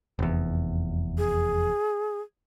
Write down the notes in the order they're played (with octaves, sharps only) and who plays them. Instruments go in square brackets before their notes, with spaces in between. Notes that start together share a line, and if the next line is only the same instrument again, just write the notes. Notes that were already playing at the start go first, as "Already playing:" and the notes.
[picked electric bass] F1 E2
[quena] G#4